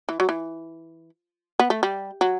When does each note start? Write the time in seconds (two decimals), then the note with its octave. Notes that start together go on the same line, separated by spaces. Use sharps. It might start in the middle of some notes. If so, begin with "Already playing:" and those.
0.09 E3
0.20 F#3
0.29 E3
1.59 B3
1.70 A3
1.83 G3
2.21 F#3